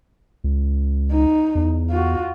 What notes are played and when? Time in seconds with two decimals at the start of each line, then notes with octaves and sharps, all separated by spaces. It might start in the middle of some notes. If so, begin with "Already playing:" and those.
0.44 C#2
1.12 D#4
1.55 E2
1.91 F4 F#4